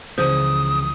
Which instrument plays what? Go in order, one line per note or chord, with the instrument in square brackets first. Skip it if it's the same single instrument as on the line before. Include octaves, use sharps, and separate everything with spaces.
[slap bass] C#2 E3 F3 [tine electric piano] C#3 [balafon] C5 [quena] D#6